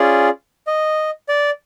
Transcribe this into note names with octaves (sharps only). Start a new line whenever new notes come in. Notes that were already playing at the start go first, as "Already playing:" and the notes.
Already playing: C#4 F4 G#4 D5
D#5
D5